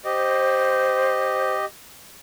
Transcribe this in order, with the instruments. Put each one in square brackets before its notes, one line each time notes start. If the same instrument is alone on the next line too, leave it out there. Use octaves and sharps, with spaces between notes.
[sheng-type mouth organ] G4 D#5 [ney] C5